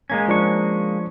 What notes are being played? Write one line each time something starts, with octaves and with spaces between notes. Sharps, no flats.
G#3 A#3 C#4 G#6
F3 D4 C#6